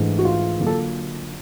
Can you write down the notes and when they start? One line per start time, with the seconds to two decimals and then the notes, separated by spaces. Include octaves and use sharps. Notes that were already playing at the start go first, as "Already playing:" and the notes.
Already playing: G#2 E3 A3 D4
0.19 F#4
0.25 F4
0.60 D3 F#3 A#3 D4 F4
0.67 A4